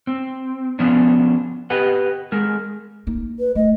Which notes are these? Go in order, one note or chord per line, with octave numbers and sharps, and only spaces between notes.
C4
F3 B3 C#4 D4
G4 B4 D#5 F#5
G#3 A#4
A#3 D#4
B4
A3 D#5